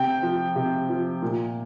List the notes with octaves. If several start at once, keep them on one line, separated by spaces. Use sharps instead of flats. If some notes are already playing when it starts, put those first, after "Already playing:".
Already playing: C3 G5
F3
C3
F3
A#2